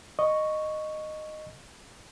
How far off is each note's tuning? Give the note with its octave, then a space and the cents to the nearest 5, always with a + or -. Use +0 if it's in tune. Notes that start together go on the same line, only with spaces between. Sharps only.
D#5 -10 C#6 +0